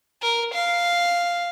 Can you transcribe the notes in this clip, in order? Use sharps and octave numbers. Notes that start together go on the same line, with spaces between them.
A#4
F5